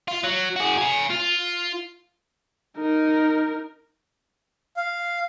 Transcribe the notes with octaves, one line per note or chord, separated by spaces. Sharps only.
F4
F#3
F#4 G#4
F5 G#5
F4
D#4 A#4
F5